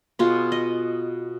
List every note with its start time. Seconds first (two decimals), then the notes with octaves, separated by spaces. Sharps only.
0.19 B2 F4 G#4
0.52 D#5